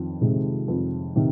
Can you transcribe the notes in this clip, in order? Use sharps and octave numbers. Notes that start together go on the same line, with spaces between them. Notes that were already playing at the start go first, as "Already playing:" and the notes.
Already playing: F2 D#3
C3 D#3 G#3
F2
C3 D#3